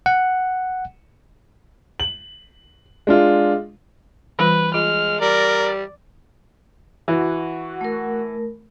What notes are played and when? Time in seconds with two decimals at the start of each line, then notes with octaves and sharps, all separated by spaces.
0.06 F#5
2.00 F#7
3.07 G#3 D4 F4
4.39 E3 G3 F4 B4
4.74 G#3 F4 F6
5.21 G3 A#4 D5
7.08 E3 F#4
7.81 A3 A#4